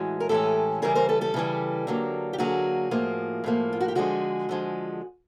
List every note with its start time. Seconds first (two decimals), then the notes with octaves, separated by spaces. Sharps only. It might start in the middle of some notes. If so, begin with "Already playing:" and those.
Already playing: A2 E3 G#3 C#4 F#4
0.20 A#4
0.29 A2 E3 G#3 C#4 G4 A4
0.82 C#3 E3 G3 G#4 A#4
0.95 A#4 C5
1.09 A4 B4
1.21 G4 A4
1.34 C#3 E3 G3
1.87 D3 F#3 A#3
2.33 G4
2.38 D3 F#3 A#3 F#4 G#4
2.91 A2 F3 A#3
3.44 A2 F3 A#3
3.73 F4
3.80 F#4
3.88 G4
3.95 D3 F3 G#3 F#4 G#4
4.49 D3 F3 G#3